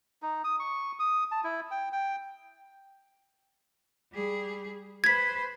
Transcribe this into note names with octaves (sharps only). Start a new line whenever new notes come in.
D#4
D#6
C#6
D#6
A5
E4
G5
G5
G3 G#4
B4 C5 G#6 B6